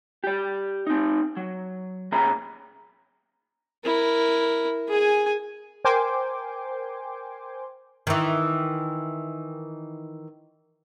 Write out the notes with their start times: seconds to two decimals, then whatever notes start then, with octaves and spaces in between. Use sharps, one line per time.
0.24 G4 D5
0.87 C4 D#4
1.37 F#3
2.12 A#2 C#4 G#4 E5 A#5 B5
3.84 E4 A#4
4.88 G#4 G#5
5.84 A#4 C5 G5 G#5 C6 D6
8.07 D#3 E3